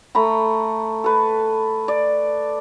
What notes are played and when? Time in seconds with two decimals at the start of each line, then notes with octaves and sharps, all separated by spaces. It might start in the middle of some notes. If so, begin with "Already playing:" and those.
0.15 A3 A#5 B5
1.04 A4 B4
1.88 D5